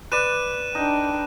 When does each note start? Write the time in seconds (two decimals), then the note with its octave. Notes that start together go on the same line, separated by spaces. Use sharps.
0.12 B4 D5 F#6 D#7 E7
0.75 D4 D#4 G5